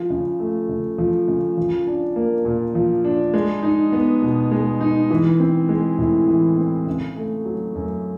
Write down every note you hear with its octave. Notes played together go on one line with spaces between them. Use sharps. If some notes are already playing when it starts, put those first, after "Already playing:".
Already playing: F3
C#3
A3
C#3
F3
C#3
F3
D4
A#3
A#2
F3
D4
G#3
D#4
B3
B2
G#3
D#4
E3
C4
G#3
A2
E3
C4
C#3
A3
F#3
F#2